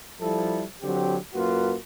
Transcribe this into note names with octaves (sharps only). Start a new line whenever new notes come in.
F3 G3 E4 A4
D3 F#3 C4 G4
F#2 A#3 F4 F#4 B4